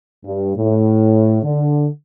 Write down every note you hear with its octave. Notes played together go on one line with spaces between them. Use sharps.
G2
A2
D3